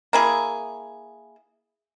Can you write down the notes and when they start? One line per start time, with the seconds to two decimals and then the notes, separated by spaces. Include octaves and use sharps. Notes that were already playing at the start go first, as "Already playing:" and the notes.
0.13 A#3 E4 G#4